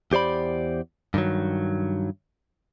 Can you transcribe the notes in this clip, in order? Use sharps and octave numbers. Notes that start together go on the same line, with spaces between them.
E2 G4 C5 D5 B5
G2 D3 D#3 F#3